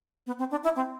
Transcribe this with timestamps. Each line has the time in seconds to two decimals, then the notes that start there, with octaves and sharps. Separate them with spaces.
0.27 B3
0.39 C4
0.51 D4
0.64 E4
0.76 C4